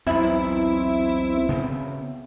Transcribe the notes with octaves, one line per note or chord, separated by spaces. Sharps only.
B1 E2 C4 E4 E5 B5
C#3 B3 C4